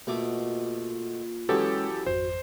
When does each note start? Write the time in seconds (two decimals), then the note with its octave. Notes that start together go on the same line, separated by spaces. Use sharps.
0.07 B2 A3 A#3 F4 D6
1.49 F#2 E3 G#3 B3 C#4 G4 A4 C#5
2.06 G#1 F2 F#4 C5